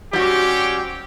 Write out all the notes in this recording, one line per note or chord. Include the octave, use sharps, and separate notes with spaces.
G3 C4 C#4 F#4 G4